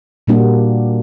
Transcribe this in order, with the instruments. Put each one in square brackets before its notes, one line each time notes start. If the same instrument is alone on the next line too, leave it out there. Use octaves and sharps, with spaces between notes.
[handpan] A#2 G3 A#3 D4 F#4